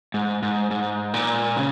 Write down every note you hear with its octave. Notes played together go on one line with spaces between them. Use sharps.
G#2
G#2
G#2
A#2
C#3